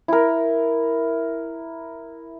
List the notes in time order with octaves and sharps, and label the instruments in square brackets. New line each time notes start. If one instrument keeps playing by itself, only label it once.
[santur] E4 A#4